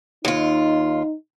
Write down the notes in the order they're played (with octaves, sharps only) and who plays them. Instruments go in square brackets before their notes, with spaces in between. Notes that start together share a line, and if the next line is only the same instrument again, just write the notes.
[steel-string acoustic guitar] D#2 F4 [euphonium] D#4